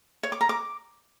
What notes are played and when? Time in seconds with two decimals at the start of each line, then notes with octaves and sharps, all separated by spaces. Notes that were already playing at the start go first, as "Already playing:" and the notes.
0.23 C#5
0.32 D6
0.41 A#5
0.49 D6